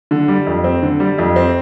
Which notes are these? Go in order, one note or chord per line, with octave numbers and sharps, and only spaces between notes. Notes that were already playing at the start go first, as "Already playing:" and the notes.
D3
G3
F2
C4
D3
G3
F2
C4